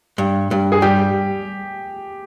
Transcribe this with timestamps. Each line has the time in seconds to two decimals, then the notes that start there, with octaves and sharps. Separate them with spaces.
0.18 G2
0.51 G2
0.72 G#4
0.82 G3 G4